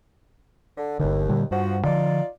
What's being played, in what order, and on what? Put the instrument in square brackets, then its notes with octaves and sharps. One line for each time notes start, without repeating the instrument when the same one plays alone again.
[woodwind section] D3
[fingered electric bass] G1 D3 [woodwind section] D#2
[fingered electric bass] A#2 D3 G3
[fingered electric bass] G2 [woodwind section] F3 F#4
[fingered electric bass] D3 F3 [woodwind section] D#4 F4 D5